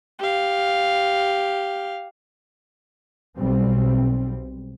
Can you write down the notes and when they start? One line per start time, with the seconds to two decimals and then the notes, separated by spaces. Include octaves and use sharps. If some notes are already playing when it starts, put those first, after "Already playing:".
0.19 G4 F5
3.39 B1 G3 C4